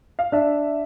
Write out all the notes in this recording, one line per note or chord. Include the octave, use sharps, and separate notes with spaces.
F5
D4 E5